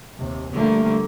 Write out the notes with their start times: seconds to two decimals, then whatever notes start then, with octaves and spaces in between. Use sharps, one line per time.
0.18 D#2 C3
0.54 D3 F3 G3 A3 A#3